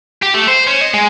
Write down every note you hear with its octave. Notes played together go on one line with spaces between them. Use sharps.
G4
A3
C5
C#4
D#5
G#3